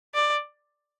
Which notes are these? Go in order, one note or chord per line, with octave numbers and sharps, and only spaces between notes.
D5